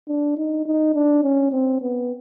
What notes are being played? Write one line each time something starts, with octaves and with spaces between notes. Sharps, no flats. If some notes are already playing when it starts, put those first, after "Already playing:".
D4
D#4
D#4
D4
C#4
C4
B3